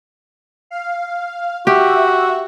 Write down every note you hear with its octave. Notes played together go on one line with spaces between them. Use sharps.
F5
F#4 G4 E5